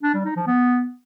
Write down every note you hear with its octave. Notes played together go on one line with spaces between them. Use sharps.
D4
G3
D#4
F3
B3